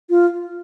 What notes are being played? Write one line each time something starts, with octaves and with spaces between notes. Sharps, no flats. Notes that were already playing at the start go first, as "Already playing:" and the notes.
F4